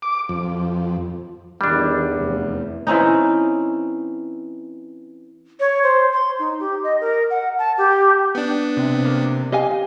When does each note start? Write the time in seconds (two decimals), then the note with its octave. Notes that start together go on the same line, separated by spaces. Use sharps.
0.02 D6
0.29 F2
1.61 E2 D#3 G3 D4
2.15 F1
2.87 E3 C4 C#4 D#4
5.60 C#5
5.83 C5
6.13 C6
6.39 D#4
6.60 G4
6.84 D#5
7.01 A#4
7.30 F#5
7.58 A5
7.78 G4
8.35 B3 D4
8.77 C3 C4
9.05 A#3
9.52 G4 D#5 F5 G#5